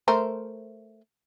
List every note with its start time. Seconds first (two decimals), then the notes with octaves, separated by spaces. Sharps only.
0.08 A3 A#4 C5